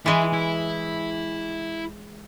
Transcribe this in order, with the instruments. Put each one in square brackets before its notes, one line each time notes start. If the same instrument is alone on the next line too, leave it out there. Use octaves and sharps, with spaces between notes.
[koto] E3 G#3 [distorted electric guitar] E4
[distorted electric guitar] E4